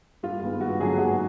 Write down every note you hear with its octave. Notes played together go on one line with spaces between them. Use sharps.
G2 F4
D#3 G#3 B3
G2 F#4
D3 F#3 B3 D4 G#4
G#2 F#4